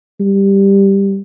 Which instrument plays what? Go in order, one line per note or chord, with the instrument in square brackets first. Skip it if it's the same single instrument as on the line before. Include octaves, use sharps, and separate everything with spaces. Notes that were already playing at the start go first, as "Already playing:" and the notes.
[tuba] G3